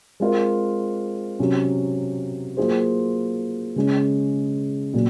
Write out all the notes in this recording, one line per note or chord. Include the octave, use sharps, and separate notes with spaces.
G#3 C4 F4 A#4
C3 F#3 C#4
F#3 A#3 F4 G#4 C5
C#3 G#3 C#4
A#2 F#3